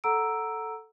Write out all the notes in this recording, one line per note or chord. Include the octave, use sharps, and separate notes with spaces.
A4 F#5 A#5 E6 D7